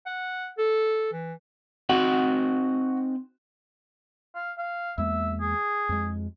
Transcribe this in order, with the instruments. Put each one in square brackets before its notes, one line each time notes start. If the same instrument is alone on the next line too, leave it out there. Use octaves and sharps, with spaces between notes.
[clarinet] F#5
A4
E3
[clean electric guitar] C4 D#4 F#5 [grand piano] F#4
[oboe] F5
F5
[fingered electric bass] E2 G#3 A#3 [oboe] E5
[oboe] G#4
[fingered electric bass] F2 G#3